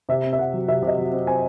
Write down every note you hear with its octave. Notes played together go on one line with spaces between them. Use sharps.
C3 E5
C4
E5
C3 F#5
F#3
C3 E5
C3 D#5
F#3
C4
C4 G#5